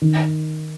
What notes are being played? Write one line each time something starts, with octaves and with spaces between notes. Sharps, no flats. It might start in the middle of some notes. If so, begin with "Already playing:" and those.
D#3